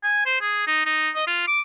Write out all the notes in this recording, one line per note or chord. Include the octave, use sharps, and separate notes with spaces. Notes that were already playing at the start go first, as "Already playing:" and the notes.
G#5
C5
G#4
D#4
D#4
D#5
F4
D6